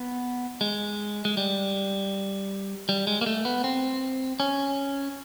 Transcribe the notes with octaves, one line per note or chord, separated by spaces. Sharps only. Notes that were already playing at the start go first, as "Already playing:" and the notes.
Already playing: B3
G#3
G#3
G3
G3
G#3
A#3
A3
B3
C4
C#4